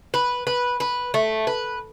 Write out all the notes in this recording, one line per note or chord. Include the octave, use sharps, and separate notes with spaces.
B4
B4
B4
A3
B4